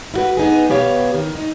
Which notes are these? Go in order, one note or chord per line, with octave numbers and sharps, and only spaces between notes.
E4 F#4 B4
B3 D#4 G#4
B2 B3 G4 C#5 F5
D#3
D#4